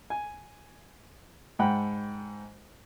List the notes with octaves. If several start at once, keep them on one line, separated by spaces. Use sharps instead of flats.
G#5
G#2 F#5 G5 B5